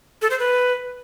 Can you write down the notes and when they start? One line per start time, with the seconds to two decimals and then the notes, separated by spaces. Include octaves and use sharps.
0.22 A4
0.31 C5
0.39 B4